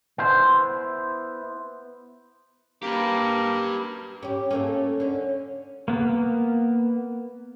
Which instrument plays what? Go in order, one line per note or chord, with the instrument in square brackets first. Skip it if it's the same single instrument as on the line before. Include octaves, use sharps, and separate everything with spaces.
[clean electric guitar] B3 E4 C5
[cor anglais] A#3 [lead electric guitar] G4 B4
[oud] C#4 G4
A3 A#3 C#4
D3 C#4
[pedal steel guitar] A#3 B3